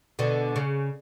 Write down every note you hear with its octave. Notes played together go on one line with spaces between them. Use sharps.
B2 D3
C#3